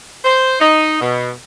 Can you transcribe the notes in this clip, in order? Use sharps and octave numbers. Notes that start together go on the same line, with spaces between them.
C5
D#4
B2